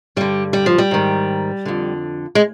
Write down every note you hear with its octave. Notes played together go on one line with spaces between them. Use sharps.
G2 D3 G3
G3
F3
G3
G#2 D#3
F2 D3
G#3